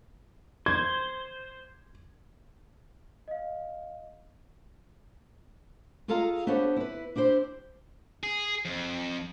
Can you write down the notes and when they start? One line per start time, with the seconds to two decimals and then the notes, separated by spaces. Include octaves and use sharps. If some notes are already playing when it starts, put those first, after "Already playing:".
0.66 C5 G#6
3.28 D#5 F5
6.08 F4 G#4 A4 D#5 F5 A#5
6.47 B3 D4 G4 A4 C5 C#5
6.76 E4 B4
7.16 D4 E4 G4 C5
8.23 G#4
8.65 F2